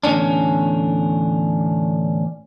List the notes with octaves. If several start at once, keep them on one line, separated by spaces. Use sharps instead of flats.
E2 A2 D3 C#4 D4